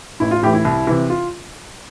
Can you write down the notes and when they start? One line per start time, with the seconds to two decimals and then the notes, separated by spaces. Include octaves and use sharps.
0.20 A1 E4
0.31 F4
0.43 A2 E3 G4
0.54 E4
0.65 C2
0.87 C3 E3
1.10 F4